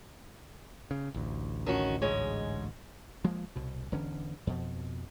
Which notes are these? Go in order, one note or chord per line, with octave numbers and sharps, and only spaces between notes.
C#3
A1 D2
D#3 C#4 F#4
G#2 G#3 C#5
F3 G#3 A#3
C2 B2
E1 D3 E3 C#4
F2 B2 F3